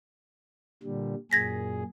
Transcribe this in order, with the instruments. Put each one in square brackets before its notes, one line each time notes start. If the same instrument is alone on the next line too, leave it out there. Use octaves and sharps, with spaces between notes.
[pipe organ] A#2 D3 G3
[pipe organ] F#2 A#2 G#4 [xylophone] G#6 A#6 B6